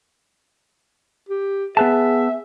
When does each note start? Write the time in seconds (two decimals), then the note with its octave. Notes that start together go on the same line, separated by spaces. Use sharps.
1.29 G4
1.77 B3 G#4 B4 E5 A5